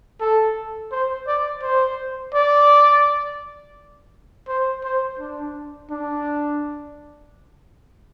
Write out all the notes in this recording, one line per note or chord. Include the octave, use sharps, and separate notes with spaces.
A4
C5
D5
C5
D5
C5
C5
D4
D4